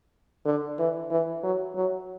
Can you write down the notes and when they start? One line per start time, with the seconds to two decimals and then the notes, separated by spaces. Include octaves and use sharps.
0.45 D3
0.78 E3
1.10 E3
1.43 F#3
1.75 F#3